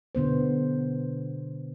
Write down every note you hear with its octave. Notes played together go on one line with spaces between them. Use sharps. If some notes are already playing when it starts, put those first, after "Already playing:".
B2 D3 B3 C5